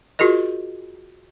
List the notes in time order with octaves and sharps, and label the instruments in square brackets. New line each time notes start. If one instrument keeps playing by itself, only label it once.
[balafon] F4 F#4 G#4 A#4 D#5